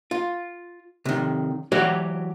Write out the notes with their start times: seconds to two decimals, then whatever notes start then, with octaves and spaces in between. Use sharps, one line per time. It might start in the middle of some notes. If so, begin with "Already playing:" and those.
0.11 F4
1.05 C3 D#3
1.72 E3 F#3 F#4 G4 C#5 D5